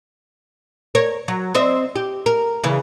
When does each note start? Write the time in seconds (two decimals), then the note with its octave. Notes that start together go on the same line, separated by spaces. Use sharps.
0.95 A#4 C#5
1.28 F#3
1.55 C4 D#5 E5
1.96 G4
2.26 A#4
2.64 C#3 E3